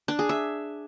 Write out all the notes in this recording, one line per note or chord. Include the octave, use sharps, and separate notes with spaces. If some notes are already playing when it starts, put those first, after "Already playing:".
D4
G#4
E5